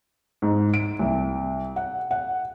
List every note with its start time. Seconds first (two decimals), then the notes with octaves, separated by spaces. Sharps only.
0.42 G#2
0.74 D7
0.99 C2
1.76 F#5
2.11 F#5